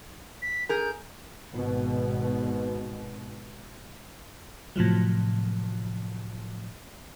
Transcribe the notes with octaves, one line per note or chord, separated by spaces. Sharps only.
B6
G#4 A#4 G6
G#1 B2
A2 C3 F3 F#3